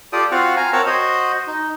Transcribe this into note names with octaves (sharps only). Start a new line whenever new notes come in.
F4 G4 A4 D5 D#6
C4 F4 F#4 F5 F#5
F5 G#5 A#5
C4 A#4 C#5 F#5 A5 E6
F#4 C5 D#5
D#4